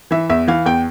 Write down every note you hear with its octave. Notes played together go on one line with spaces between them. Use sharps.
E3 E5
E2 E5
E3 F5
E2 G5